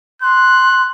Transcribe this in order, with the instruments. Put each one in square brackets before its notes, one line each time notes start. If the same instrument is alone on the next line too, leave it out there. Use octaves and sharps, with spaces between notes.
[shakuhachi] C6 [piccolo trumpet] F#6